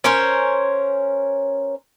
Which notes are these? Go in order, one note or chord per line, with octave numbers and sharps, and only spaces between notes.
C#4 A#4 C5 C#5